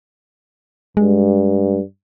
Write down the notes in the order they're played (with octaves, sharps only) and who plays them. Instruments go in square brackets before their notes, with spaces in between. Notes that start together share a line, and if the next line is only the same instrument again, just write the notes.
[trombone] G2 [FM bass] G#3